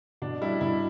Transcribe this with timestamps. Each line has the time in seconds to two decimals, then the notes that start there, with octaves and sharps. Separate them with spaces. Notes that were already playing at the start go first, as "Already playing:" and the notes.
0.22 B2 D4
0.41 G3 D4 E4
0.61 B2 E4